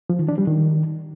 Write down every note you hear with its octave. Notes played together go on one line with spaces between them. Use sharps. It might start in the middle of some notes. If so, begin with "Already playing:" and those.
F3
D#3
D4
G3
D#3